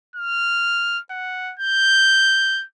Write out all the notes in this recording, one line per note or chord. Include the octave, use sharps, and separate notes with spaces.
F6
F#5
G6